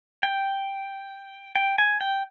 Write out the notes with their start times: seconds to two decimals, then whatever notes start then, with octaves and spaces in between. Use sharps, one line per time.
0.23 G5
1.56 G5
1.78 G#5
2.01 G5